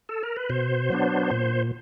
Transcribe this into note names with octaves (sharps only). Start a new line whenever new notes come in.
A4
A#4
B4
B2 C5
F#3 B3 D4
A#2